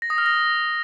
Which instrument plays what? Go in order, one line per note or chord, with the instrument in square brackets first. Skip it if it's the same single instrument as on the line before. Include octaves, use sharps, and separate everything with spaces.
[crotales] A#6
D#6
F6
A#6